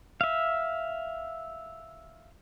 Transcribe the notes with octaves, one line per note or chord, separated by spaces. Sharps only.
E5 F5